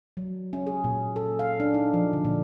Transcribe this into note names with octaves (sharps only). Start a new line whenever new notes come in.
F#3
C#4
G#4
A#2
A4
F5
D4
D#4
F3
D3
A#2